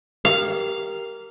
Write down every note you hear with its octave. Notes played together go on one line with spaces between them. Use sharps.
G4 A#4 F5